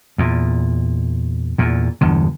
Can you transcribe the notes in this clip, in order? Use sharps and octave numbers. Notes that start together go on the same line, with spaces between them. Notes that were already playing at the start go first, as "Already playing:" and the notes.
E2 A#2
E2 A#2
G1 E2 D3